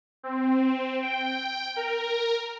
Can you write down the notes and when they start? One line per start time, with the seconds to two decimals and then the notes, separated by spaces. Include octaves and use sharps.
0.23 C4
1.02 G5
1.76 A#4